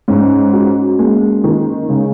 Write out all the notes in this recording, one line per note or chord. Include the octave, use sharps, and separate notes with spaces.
G#2 C#4
F#4
G#3 A#3
D#3
C#3 G#3